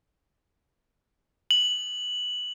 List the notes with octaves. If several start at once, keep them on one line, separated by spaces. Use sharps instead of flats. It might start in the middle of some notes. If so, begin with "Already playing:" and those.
F#7